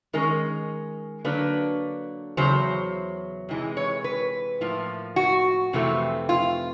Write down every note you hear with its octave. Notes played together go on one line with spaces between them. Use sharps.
D#3 G#3 C#4 A#4
D3 F#3 A#3 D4 B4
E2 C#3 F#3 C5
C3 E3 G#3
C#5
B4
A2 F3 A#3
F#4
F2 C3 E3 A3 C4
F4